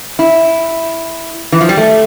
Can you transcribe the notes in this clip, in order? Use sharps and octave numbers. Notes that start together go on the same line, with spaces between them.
E4
E3
F3
G3
A3